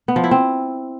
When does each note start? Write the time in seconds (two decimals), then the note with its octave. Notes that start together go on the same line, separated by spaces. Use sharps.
0.08 B3
0.16 F3
0.24 E4
0.31 C4